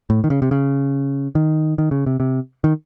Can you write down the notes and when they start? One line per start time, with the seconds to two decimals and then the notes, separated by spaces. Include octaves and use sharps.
0.10 A2
0.24 D#3
0.30 C#3
0.42 C3
0.51 C#3
1.35 D#3
1.78 D#3
1.91 C#3
2.06 C3
2.20 C3
2.64 D#3